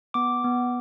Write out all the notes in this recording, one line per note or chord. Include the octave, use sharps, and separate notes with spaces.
B3 D6
B3